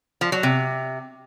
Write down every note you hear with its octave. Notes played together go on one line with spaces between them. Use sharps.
F3
F#3
C3